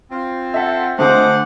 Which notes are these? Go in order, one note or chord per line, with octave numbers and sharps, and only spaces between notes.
C4 F4 C5
A4 E5 F#5
D2 G#3 A3 C4 F4 C5 F#5 D6